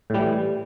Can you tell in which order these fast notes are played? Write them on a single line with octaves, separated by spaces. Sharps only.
A2 G3 E3